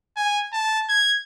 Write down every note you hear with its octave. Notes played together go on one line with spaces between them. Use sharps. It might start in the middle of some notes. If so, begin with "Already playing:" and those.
G#5
A5
G#6